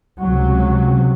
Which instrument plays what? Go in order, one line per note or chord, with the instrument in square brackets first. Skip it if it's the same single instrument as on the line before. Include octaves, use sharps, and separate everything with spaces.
[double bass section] C#2 C3 F#3